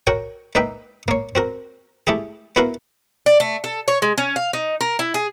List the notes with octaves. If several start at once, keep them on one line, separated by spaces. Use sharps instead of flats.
F#4 A#4 C#5 G5
A#3 D#4 B4 E5 G5
A#3 C#5
C4 F#4 A#4
A3 E4 G4 G#4
B3 E4 F#4 A#4 B4 F5
D5
A3
A4
C#5
G#3
C#4
F5
D#4
A#4
E4
G#4